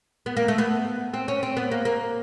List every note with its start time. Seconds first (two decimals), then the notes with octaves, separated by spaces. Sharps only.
0.26 B3
0.37 A#3
0.48 A3
0.58 B3
1.14 C4
1.28 C#4
1.43 C4
1.57 B3
1.71 A#3
1.85 A#3